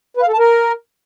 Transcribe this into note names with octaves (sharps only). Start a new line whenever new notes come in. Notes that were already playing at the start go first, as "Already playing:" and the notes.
B4
F5
A4
A5
A#4